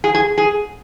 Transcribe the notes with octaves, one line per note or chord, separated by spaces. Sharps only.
G#4
G#4
G#4